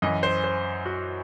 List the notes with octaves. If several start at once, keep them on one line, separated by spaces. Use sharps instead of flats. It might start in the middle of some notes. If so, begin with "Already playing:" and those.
F#2 E3 D#5
C5
C5
F#4